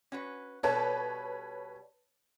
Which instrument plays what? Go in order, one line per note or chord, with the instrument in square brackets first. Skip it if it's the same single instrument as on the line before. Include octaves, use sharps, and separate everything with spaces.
[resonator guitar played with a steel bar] C#4 F#4 B4
[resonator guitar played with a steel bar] B2 G3 A4 [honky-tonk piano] B4 C#5 A5